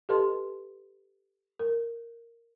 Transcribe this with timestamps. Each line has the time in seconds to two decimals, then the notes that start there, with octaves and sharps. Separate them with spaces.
0.09 G4 A4 B4 D#5 A5 C6
1.59 A#4